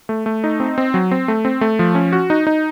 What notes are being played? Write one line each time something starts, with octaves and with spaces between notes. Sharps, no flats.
A3
A3
D#4
C4
C4
F#3
C4
A3
C4
A3
F3
C#4
F#4
D#4
D#4